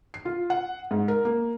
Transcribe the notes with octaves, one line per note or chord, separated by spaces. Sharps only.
C7
F4
F#5
G#2
A#4
A#3